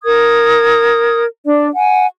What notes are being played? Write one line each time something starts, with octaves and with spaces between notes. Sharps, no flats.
A#4 D#6 G#6
D4 D5
F#5 G#5